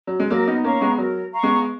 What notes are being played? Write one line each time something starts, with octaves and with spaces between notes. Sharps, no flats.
F#3
G#3
F#3 A#3 A#4
B3 D#4
A#3 C#4 F5 A#5 C#6
G#3 B3
F#3 A#4
F5 A#5 C#6
G#3 B3